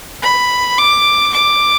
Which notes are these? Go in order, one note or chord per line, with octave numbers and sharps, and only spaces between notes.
B5
D6
D6